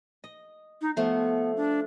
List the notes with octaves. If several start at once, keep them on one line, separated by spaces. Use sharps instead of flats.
D#5
D#4
F3 A3 B3 C6
D4